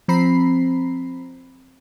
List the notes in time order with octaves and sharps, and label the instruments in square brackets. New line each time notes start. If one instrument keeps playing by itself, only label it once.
[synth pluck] F3 C4 A#5 B5 C7